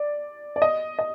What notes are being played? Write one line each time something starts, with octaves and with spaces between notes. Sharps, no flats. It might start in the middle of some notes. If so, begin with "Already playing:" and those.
Already playing: D5
D5
D#5
D#5